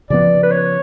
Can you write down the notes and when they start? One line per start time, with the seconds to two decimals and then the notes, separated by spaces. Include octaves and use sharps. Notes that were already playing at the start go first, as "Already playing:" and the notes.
0.10 C#3 F3 B3 D5
0.43 B4
0.52 C#5